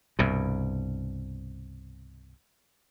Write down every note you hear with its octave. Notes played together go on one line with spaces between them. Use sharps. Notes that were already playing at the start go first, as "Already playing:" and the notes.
C2 G2 B2